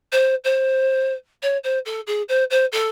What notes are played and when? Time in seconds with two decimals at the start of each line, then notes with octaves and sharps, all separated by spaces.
0.12 C5
0.44 C5
1.42 C#5
1.64 C5
1.85 A4
2.07 G#4
2.29 C5
2.50 C5
2.72 A4